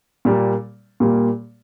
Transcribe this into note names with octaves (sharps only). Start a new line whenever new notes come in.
A#2 G3 A#3
A#2 G3 A#3